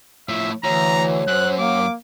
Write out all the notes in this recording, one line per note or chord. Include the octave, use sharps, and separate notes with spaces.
A2 F3 E5
D2 E3 C#5 A#5
F#2 C5 F#6
A#3 D6